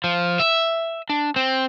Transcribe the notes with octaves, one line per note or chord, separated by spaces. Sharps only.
F3
E5
D4
C4